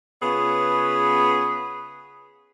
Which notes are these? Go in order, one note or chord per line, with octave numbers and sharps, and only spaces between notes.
C#3 B3 F4 G#4 B4 C#5